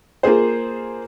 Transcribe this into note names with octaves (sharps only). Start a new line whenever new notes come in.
A#3 F4 G#4 C5